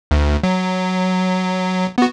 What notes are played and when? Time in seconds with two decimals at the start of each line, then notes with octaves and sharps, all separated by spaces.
0.11 D2
0.43 F#3
1.98 B3 F#4